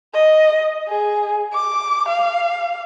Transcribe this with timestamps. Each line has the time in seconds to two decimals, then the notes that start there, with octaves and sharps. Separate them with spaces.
0.14 D#5
0.88 G#4
1.53 D6
2.08 F5